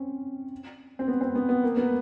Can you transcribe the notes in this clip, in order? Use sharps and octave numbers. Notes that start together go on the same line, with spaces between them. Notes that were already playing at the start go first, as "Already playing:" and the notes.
Already playing: C4 C#4
C4
B3
C4
B3
B3
A#3
B3